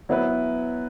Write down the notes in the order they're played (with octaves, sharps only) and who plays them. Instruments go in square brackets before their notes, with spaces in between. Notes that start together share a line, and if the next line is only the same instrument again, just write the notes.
[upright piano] F#3 B3 E4 B4